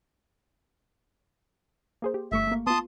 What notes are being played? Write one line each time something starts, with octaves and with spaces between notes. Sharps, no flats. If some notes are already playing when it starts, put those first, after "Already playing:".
A#3 G#4 C5
G4
G1 A3 E5 C#6
A3 A#3
B3 F4 A5 C6 D#6